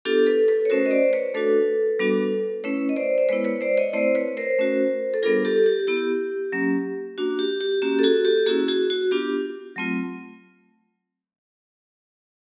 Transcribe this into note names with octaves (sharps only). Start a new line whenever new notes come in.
B3 D4 F4 G4 A4
A4 B4
A4 B4
C#5
A3 C#4 F#4 A#4 C5
D#5
C5 D5
B4 C#5
A3 D4 F#4 A4 B4
G3 B3 D4 F#4
A3 C#4 E4 B4 C#5
D#5
C5 D5
C5
G#3 B3 E4 B4 C#5
B4 C#5
C5 D5
C#5 D#5
A3 C4 E4 C5 D5
B4 C#5
A#4 C5
A3 C#4 F#4
A4
G3 B3 D4 F4 G#4 A#4
G4 A4
G4
B3 E4 G4
F#3 A#3 C#4
A#3 D4 F#4
G4
G4
A#3 C#4 F#4 G4
A4
F#4 G#4
G4 A4
A#3 C#4 E4 F#4 G#4
F#4 G#4
F#4
B3 D4 F4 G4
F#3 A3 C4 F4